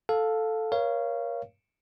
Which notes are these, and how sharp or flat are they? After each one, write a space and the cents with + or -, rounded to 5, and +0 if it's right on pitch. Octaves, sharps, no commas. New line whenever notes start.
A4 +0 F5 +15
A#4 +30 C#5 +0 F5 -20